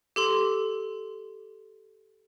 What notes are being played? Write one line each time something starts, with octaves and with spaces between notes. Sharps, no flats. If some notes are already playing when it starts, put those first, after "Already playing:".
G4 A4 C6